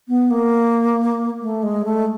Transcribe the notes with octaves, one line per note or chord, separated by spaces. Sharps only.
B3
A#3
A3
G#3
A3